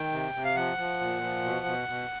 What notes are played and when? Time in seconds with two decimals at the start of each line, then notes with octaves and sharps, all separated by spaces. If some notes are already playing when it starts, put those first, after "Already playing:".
Already playing: D#3 G5
0.12 C3
0.35 C3
0.45 F5
0.56 F3 F#5
0.78 F3
1.00 A#2
1.22 F3
1.44 B2
1.66 B2
1.88 B2